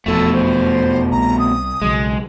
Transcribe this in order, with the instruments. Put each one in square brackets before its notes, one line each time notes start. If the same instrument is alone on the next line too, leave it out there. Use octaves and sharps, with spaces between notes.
[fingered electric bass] F1 E2 F3 [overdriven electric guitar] B2 A3 [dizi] A4
[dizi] C5
[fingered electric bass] C2 [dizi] A#5
[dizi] D#6
[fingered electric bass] B1 C#3 F#3 [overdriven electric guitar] G#3